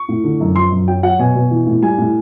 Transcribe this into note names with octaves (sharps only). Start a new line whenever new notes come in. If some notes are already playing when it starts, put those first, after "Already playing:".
Already playing: C#6
A2
D3
F#2
F3 C6
F#2
F#3 G5
F#3 F#5
B2 G#5
B2
E3
A2
G3 G#5
A2